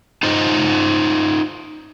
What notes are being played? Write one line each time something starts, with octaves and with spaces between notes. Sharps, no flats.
D#4 F4 C5 D#5